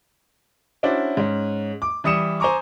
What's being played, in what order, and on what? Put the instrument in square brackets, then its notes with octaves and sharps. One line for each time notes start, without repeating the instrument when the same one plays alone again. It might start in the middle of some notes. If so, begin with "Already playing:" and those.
[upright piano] C#4 D4 E4 F#4 C5 D5
G#2 C#4
D6
E3 G3 D#6 C#7 E7
C5 G#5 A#5 C#6 D6